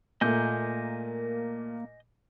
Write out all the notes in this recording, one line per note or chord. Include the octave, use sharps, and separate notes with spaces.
A#2 A3 A#3 D#5 G#5 G6